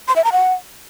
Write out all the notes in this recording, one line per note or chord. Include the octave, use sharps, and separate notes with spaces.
C6
E5
A#5
F#5